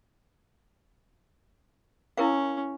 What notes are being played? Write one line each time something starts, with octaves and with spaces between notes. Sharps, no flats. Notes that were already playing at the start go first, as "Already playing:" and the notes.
C#4 E4 A#4 F5